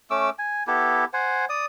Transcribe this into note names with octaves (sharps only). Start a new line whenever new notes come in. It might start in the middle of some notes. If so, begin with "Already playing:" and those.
A3 C#4 D6 E6
G#5
B3 E4 G4 A4
C5 F#5 G#5
D5 D#6